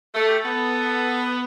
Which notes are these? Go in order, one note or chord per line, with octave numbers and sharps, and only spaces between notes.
A3 A4
G4
A4
B3